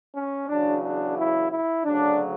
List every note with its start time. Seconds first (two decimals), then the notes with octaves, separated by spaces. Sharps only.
0.15 C#4
0.48 E2 C#3 F#3 D4
0.82 D4
1.17 E4
1.51 E4
1.84 D2 C#3 F#3 D4